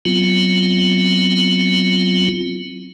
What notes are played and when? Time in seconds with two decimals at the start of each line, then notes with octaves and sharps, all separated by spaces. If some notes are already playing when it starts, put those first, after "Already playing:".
0.05 F#3 B3 C4 E4 F4